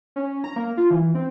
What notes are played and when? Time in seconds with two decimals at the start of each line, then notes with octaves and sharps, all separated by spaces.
0.16 C#4
0.44 A#5
0.56 A#3
0.77 F4
0.90 E3
1.15 C4